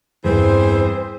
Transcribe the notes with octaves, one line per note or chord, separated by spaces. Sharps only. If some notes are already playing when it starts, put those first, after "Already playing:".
E2 G2 E3 C4 G#4 C5